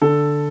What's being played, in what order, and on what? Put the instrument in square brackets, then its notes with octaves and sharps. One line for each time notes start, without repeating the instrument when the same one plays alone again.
[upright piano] D3 A4